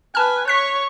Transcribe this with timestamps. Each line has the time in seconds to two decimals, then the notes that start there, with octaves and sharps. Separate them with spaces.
0.15 B4 G#5 A5 F6
0.48 C#5 C#6 F#6 B6